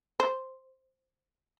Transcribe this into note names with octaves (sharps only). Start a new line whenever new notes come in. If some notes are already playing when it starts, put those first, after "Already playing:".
C5